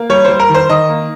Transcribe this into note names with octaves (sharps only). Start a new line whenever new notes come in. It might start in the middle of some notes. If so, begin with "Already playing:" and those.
Already playing: A#3
G3 C#5
G3 C5
A#4
D#3
C5
D#3 D#5
A#3